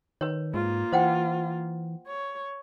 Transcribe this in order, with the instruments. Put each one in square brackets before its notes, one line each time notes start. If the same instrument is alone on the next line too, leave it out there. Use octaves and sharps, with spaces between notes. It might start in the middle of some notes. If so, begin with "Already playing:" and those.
[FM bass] D#3 [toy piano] B4 C#5
[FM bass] G#2 [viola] A#3 F4
[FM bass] E3 [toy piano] C5 F#5 G5
[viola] C#5